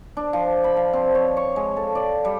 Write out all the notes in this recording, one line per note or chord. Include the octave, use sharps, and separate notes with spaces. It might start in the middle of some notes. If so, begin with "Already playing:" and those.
D4
F3
B5
F5
C4
C#5
C#6
G#3
A4
D5
G3